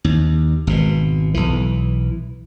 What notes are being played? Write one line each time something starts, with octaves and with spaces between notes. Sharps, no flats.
D#2
G#1 B2
B1 E3